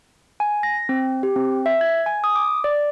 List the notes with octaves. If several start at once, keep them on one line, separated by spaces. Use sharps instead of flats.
G#5
A#6
C4
G4
C4
E5
G#6
G#5
D#6
D6
D5